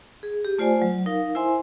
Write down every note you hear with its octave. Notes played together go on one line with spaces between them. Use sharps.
G#4
G4
A3 F4 C5 D5 G#5
F#3
D#4 A#4 F5
E4 C5 E5 G#5 C6